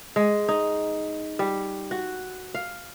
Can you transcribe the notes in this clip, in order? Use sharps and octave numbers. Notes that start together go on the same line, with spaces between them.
G#3
D#4
G3
F#4
F5